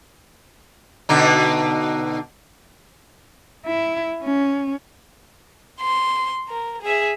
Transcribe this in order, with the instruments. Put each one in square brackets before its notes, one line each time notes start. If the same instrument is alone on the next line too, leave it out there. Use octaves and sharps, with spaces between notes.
[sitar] B2 D3 D#4
[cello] E4
C#4
[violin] C6
A#4
G#4 E5